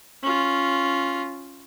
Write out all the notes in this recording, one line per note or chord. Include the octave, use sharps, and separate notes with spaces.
C#4 F4